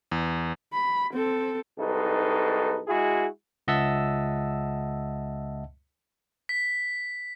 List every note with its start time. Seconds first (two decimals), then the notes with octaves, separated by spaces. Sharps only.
0.12 E2
0.72 B5
1.14 C4 A4
1.78 C2 G#2 D#4 A4 B4
2.88 G#3 E4 F#4 G#4
3.68 C#2 D#5 E5 F#5 A5 E6
6.49 B6